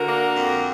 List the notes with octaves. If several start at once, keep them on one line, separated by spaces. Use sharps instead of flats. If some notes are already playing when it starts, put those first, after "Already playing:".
Already playing: D3 F#4 A#4
A#3
F2